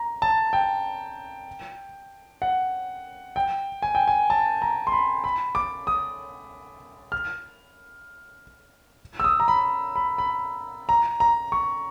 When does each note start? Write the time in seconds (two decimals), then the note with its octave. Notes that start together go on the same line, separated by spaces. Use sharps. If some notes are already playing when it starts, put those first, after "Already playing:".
Already playing: A#5
0.22 A5
0.53 G5
2.42 F#5
3.36 G5
3.82 G#5
3.95 G5
4.08 G#5
4.30 A5
4.62 A#5
4.87 C6
4.92 B5
5.24 B5
5.55 D6
5.87 D#6
7.12 F6
9.20 E6
9.24 D#6
9.40 A#5
9.48 B5
9.96 B5
10.18 B5
10.89 A#5
11.20 A#5
11.52 C#6